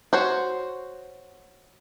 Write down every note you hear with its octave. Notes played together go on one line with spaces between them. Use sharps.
F#4 C5 C#5